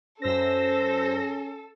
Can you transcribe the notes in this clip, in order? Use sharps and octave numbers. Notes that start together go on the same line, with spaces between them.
F#2 C#4 A4 C5 E6 A#6